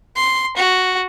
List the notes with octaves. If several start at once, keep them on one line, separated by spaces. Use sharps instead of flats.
C6
F#4